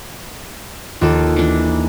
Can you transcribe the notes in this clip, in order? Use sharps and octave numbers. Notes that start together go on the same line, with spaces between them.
D#2 F4 A4
E3 D4